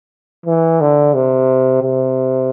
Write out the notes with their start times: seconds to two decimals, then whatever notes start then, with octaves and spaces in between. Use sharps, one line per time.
0.46 E3
0.81 D3
1.14 C3
1.82 C3